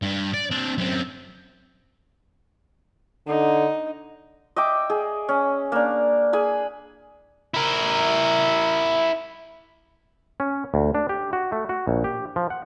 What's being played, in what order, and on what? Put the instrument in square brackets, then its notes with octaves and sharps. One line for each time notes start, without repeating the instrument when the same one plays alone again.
[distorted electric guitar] G2
D5
C4 D4
F#2 C4
[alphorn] D3 [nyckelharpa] D#4
[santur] D#5 E5 G5 D6
G#4
C#4
A#3 D4
G#4 G#5 B5
[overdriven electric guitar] E4 A#4
[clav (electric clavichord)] C#4
D2
D4
G4
F#4
A3
F#4
A#1
G4
F3
F#5